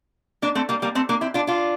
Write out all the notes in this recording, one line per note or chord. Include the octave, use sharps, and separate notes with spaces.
A#3 D4
A3 C4
G3 A#3
G3 A#3
A3 C4
A#3 D4
C4 E4
D4 F4
D4 F4